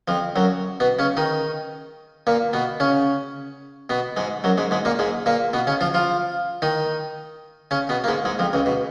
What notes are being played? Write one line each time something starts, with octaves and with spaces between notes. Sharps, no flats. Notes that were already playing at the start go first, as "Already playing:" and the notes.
F2 F3
F#2 F#3
B2 B3
C#3 C#4
D#3 D#4
A#2 A#3
B2 B3
C#3 C#4
B2 B3
G#2 G#3
F#2 F#3
G#2 G#3
G#2 G#3
A#2 A#3
G#2 G#3
A#2 A#3
B2 B3
C#3 C#4
F3 F4
F3 F4
D#3 D#4
C#3 C#4
B2 B3
A#3
G#2 G#3
G#2 G#3
F2 F3
C#2 C#3
B2